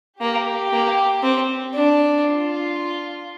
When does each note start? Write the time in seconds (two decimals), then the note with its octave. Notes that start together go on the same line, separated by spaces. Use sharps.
0.21 A#3 G4
0.73 A#3
1.23 C4
1.74 D4
2.25 F4